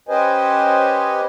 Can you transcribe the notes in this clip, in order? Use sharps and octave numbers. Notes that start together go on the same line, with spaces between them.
C#4 G4 B4 C5 D#5 G#5